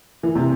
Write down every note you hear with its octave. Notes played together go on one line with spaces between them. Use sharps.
E3
C3